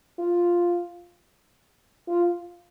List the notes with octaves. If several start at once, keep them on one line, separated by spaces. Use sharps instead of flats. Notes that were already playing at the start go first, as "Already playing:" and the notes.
F4
F4